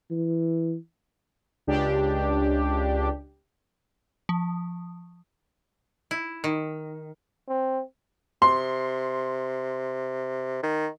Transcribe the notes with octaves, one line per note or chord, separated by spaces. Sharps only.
E3
C#2 D4 G4
F3
E4
D#3
C4
C3 C6
D#3